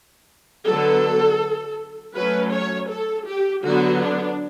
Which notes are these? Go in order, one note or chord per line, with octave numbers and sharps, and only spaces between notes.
D3 F#3 B3 A4
F#3 A3 C#4 B4
C#5
A4
G4
D3 F#3 B3 F#4
D4